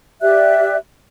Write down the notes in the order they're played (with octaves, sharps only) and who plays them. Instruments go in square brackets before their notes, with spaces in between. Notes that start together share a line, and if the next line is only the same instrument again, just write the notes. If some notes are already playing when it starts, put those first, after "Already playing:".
[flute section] G4 D5 E5 F#6